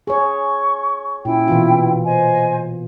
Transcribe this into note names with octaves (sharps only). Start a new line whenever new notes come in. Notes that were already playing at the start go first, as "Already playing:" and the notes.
G#4 C#5 C#6
A#2 C#4 E4 G5
B2 E3 F4
C5 D#5 G#5